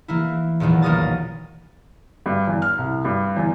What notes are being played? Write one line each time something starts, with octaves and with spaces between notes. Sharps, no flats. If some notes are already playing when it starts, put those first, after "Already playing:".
E3 A#3 E4
E2 A#2 D#3 E3 F#3
B1 A#3 A#4 D#6 A6
G2
E2
F6
C2
G2
E2